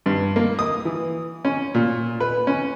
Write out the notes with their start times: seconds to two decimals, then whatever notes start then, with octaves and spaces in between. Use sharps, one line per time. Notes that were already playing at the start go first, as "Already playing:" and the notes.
0.06 G2
0.36 A#3
0.59 D#6
0.85 E3
1.45 C#4
1.74 A#2
2.20 B4
2.47 C#4